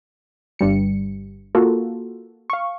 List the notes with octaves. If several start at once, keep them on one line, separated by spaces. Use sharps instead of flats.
G1 G2 G3 C#7
A#3 F4 F#4 A4
F5 C#6